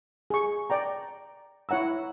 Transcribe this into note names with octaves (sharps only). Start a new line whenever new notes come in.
G#4 C#6
D5 G5 A#5
E4 C#5 F#5 A#5 E6